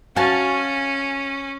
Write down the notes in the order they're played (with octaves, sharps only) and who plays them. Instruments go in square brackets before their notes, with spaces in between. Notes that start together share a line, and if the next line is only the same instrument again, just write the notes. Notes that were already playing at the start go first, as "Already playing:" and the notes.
[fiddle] C#4 [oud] F#4 [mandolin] F5 G#5 A5